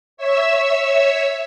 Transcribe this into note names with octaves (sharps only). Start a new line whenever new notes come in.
C#5 E5 E6